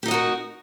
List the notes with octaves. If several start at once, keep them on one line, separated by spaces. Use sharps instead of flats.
D#4 F#4 G4 A#4 D#5